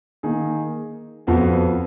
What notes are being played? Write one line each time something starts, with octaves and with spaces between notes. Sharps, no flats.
D#3 A#3 D#4 G#4
F2 F3 B3 F#4